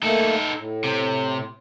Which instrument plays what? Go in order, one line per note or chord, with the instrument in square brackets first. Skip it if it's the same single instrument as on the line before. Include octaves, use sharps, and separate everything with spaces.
[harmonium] A3 A#3 [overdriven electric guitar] D#4 A4
[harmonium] A2
[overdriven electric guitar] C3